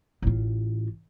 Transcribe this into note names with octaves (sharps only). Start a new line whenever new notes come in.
A1 F4